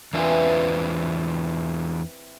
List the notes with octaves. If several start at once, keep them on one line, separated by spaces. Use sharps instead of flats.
E2 E3 C4 D4 F4